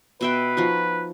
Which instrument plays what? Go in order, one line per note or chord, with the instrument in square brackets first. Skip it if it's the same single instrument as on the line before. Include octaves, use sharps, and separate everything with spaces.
[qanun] B2 E5 G5 [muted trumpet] B4
[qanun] F3 D#4 F#4